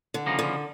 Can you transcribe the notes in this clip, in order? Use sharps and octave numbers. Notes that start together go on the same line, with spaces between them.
D3
C#3 F3 A#3 D#4
D3